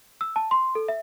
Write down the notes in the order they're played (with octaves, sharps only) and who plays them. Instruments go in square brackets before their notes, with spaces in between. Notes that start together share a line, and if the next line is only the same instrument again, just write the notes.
[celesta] E6
A5
C6
A4
E5